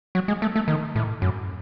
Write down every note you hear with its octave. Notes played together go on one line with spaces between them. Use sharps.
F#3
G#3
A3
A3
D#3
A2
F#2